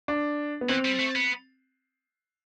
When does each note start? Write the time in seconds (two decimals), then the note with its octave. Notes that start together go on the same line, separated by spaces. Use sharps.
0.08 D4
0.61 B3
0.69 E3 C4
0.85 G3
0.99 A3
1.16 B3